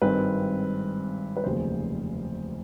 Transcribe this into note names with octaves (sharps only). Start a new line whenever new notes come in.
G#1 G2 D#3 G#3 C4 B4
B4
F1 D#2 C#3 F#3 C5